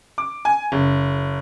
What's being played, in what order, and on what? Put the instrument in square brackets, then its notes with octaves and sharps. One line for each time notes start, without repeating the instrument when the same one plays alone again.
[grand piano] D6
G#5
F#1